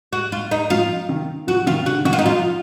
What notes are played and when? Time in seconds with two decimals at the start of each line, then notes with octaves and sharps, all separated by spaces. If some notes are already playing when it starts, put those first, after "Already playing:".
0.13 F#4
0.32 F4
0.51 D#4
0.70 F3 F4
1.09 D#3
1.47 F3 F#4
1.66 D#3 F4
1.86 D3 F#4
2.05 D#3 F#4
2.13 F4
2.19 D#4
2.25 F3 F4